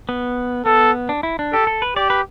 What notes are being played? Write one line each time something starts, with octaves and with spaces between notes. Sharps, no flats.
B3
B3 A4
D4
E4
D4
G4 A4
A4
B4
G4 D5
B4